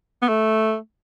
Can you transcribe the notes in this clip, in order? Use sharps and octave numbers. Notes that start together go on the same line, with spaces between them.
B3
A3